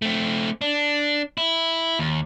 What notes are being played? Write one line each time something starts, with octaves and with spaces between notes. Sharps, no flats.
A3 C4
D4
E4
D#2